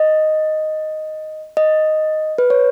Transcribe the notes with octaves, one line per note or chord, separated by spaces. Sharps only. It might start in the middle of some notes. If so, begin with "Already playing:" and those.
Already playing: D#5
D#5
B4
C#5